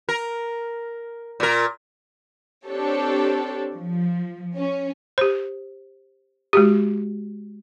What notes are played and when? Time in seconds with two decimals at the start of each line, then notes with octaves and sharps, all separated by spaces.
0.09 A#4
1.40 A#2 A#4
2.66 C4 D4 G4 A4 C#5
3.73 F3
4.56 C#4
5.18 G4 C5
6.53 G#3 F#4 G4